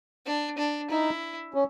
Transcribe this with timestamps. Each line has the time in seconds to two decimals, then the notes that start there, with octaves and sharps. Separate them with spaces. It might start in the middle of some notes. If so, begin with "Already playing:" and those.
0.26 D4
0.58 D4
0.90 D#4 E4
1.54 C#4